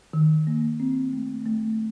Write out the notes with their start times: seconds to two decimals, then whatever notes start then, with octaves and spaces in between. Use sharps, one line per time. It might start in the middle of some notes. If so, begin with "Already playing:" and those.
0.13 D#3
0.47 A#3
0.80 C4
1.13 A3
1.46 A3